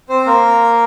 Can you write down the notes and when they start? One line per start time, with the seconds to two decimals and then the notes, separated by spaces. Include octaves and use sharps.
0.09 C4 C5
0.26 A#3 A#4